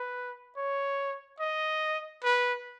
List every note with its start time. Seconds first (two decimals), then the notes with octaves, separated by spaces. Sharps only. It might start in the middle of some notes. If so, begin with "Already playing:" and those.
Already playing: B4
0.57 C#5
1.40 D#5
2.24 B4